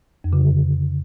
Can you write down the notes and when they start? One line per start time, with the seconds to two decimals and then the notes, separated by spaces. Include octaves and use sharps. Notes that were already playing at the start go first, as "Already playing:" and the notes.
0.24 F2
0.33 C#3
0.41 D3